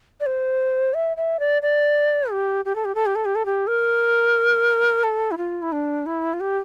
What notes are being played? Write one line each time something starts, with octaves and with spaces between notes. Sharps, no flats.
D5
C5
E5
E5
D5
D5
G4
G4
A4
G4
A4
G4
A4
G4
A4
G4
A#4
A4
E4
F4
E4
D4
E4
F4
G4